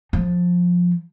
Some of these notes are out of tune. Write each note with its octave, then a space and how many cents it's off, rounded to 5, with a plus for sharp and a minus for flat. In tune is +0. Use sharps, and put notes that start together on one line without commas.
F3 +15